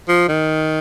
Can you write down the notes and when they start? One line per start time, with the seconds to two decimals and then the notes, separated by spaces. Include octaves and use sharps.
0.08 F3
0.29 D#3